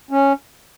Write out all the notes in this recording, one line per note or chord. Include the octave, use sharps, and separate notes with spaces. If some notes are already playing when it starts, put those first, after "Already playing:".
C#4